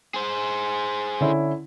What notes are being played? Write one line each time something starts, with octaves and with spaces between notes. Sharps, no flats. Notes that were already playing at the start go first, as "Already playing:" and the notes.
G#4 C5
D3 C#4 E4